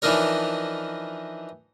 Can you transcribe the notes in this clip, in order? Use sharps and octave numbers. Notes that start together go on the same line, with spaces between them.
E3 F3 D4 D#4 A#4 C#5